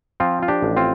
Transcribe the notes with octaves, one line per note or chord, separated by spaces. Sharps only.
F3 C4 F4
F4
D4 G4
A1
C4 F4